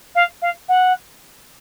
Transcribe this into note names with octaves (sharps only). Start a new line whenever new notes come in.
F5
F5
F#5